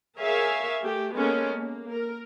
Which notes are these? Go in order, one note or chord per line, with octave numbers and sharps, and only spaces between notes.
G#4 A#4 C#5 E5 F5 G#5
A3 G4
G#3 A#3 B3 C#4 A4 A#4
A#3
A#4